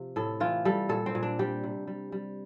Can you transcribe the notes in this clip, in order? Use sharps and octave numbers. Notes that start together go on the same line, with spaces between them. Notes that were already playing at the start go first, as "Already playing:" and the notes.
Already playing: C3 F3
A2 A4
E3 F4
G3 A4
A#2 A4
C4
A#2
D4
G3 G4
C3
G3
G3